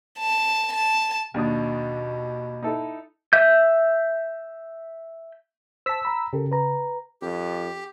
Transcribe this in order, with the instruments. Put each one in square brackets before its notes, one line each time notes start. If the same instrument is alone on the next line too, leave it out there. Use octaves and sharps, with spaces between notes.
[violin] A5
A5
[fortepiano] D#2 D4 D#6 [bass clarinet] B2
[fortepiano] D#4 E4 A4
[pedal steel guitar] E5 G6
[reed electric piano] C5 A5 [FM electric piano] E6 B6
[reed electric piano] A#5 B5
[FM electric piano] C#3 [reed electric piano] G4 A4 A#4
[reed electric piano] B4 A#5
[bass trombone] F2 [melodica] G4